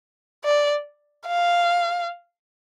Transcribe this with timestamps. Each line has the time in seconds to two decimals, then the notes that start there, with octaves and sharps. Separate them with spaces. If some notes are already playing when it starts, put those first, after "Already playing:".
0.45 D5
1.27 F5